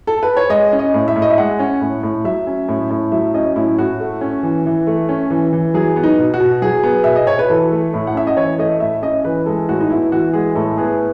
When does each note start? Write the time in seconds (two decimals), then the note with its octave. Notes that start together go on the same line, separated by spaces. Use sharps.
0.07 A4
0.23 B4
0.37 C#5
0.49 G#3 D#5
0.72 C#4
0.79 D#5
0.94 A2
1.08 E5
1.16 A2
1.22 D#5
1.30 E5
1.38 G#3 F#5
1.59 C#4
1.81 A2
2.03 A2
2.24 F#3 E5
2.47 C#4
2.68 A2
2.90 A2
3.12 F#3 E5
3.34 C#4 D#5
3.56 A2 E4
3.79 A2 F#4
4.00 A3
4.21 C#4
4.43 E3
4.66 E3
4.87 A3
5.09 C#4
5.30 E3
5.53 E3
5.74 F#3 G#4
5.96 B3
6.03 D#4
6.18 B2
6.34 F#4
6.40 B2
6.62 F#3 G#4
6.83 B3
7.04 B2 E5
7.16 D#5
7.27 B2 C#5
7.39 B4
7.50 E3 A4
7.71 A3
7.94 A2
8.07 F#5
8.15 C#4 E5
8.27 D#5
8.37 E3 C#5
8.58 A3 D#5
8.80 A2 E5
9.02 C#4 D#5
9.25 E3 B4
9.46 G#3 A4
9.69 A2 F#4
9.81 D#4
9.90 B3 E4
10.12 E3 F#4
10.33 G#3 G#4
10.55 A2 A4
10.78 B3 G#4